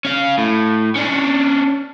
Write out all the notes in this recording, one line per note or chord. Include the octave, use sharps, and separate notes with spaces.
C#4 F5
A2
C#4 D4